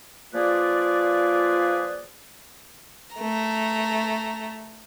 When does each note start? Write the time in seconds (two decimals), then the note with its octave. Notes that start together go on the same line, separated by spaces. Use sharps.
0.34 F3 A#3 F4 G#4 B4 D5
3.16 A3 A#5